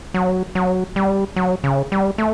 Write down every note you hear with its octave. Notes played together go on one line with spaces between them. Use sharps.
F#3
F#3
G3
F#3
C#3
G3
A3